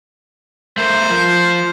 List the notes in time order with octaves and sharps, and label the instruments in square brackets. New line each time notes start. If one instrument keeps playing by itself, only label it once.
[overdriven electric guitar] A3 A#4 [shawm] C5
[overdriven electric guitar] F3